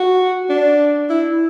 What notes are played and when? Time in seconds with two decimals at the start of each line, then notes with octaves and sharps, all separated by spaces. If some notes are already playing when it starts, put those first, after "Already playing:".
Already playing: F#4
0.50 D4
1.10 E4